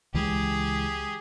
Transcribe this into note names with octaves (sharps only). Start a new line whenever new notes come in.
C#2 E3 G#3 G4 G#4